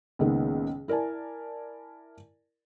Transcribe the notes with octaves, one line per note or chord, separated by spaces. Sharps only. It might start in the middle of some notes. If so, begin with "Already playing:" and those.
C#2 A#2 D#3 G#3 B3
E4 A#4 D5 G#5 A5